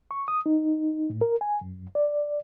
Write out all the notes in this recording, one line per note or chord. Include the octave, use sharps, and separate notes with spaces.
C#6
D#6
D#4
A2
A#4
G#5
F#2
D5